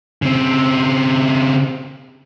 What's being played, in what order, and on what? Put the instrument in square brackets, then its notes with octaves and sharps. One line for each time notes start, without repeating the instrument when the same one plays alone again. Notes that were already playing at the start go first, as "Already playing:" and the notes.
[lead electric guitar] C#3 C4